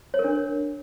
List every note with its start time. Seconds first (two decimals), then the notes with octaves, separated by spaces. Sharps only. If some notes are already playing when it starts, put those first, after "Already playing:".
0.14 C#5
0.19 A#4
0.24 D4